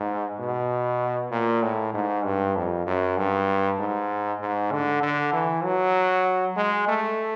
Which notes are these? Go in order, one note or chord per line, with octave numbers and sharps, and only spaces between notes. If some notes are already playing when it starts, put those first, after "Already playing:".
Already playing: G#2
B2
A#2
A2
G#2
G2
F2
F#2
G2
G#2
G#2
D3
D3
E3
F#3
G#3
A3